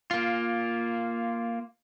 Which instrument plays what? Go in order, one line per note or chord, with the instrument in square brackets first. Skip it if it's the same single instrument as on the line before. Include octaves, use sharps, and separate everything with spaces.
[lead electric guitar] A#3 F4